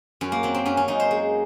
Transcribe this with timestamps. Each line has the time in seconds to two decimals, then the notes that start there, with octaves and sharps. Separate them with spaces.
0.21 F#2 C#4
0.32 A#3
0.43 F#3 C4
0.54 C4
0.66 F#2 C#4
0.77 C#4
0.88 F#2 D#4
1.00 C5
1.11 G#3